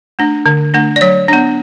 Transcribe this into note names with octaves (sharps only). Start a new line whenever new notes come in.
A3 D4
D3
A3 D4
D5
F#3 C#5
B3 D4